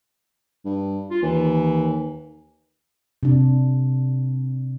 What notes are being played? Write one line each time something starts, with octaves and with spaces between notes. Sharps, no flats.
G2
F4
D#2 E3
C3 D4